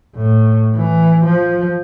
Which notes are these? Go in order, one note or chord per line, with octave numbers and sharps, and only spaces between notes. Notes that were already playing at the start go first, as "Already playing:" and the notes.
A2
E3
F3